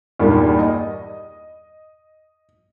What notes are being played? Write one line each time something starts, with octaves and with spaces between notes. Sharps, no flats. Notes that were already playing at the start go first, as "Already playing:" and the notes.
E2 G2 A#2 D#3 G3 A#3
D#5